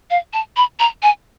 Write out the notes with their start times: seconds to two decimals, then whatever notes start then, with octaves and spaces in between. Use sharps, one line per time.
0.10 F5
0.33 A5
0.57 B5
0.80 A#5
1.03 G#5